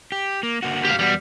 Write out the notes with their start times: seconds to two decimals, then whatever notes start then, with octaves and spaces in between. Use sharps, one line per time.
0.12 G4
0.43 A#3
0.63 D3 A#3 F#4
0.85 G4 F5
0.99 E2 G3 B3 F#4